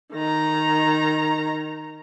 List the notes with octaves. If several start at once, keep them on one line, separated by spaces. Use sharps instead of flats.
D#3 A#5